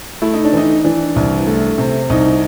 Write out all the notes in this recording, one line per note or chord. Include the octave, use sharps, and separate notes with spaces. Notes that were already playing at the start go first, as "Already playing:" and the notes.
A3 E4
D#4
D4
E3 D#4
E3 D4
C2
A3
C3
C2 D#4